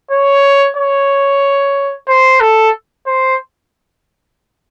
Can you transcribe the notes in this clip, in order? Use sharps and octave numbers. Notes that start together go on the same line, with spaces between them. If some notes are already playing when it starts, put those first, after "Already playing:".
C#5
C#5
C5
A4
C5